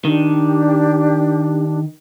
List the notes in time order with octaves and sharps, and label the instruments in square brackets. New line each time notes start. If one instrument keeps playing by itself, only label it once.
[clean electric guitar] D#3 [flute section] D4 G4